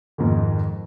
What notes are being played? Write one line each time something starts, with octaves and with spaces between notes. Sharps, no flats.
F2 G#2 D#3